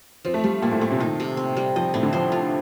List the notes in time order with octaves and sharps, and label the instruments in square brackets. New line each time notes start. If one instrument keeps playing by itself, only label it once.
[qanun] F3 [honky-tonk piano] C4
[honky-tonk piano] A3
[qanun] F3 [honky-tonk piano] G3
[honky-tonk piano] A#2 [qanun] C4
[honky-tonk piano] A2
[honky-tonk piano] A#2 [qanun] A3
[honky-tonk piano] C3
[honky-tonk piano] D#3 [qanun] D#4
[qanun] C3
C4
G3
[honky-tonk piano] F3 [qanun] D#5
[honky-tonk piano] A2 [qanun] C4
[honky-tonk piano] D3
[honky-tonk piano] F3 [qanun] C5
[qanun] F4